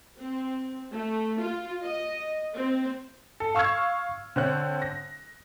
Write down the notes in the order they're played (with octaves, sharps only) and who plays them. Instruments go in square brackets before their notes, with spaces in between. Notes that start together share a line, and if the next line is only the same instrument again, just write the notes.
[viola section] C4
A3
F4
D#5
C4
[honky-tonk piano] A4
F5 C#6 E6 F6 G#6
D3 C4 C#5 F#6
A#6